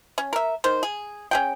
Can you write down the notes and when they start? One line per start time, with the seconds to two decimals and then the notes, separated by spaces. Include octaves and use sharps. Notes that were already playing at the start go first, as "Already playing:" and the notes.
0.18 C#4
0.33 A#4 E5
0.64 D#3 C5
0.83 G#4
1.31 C#4 G#4 G5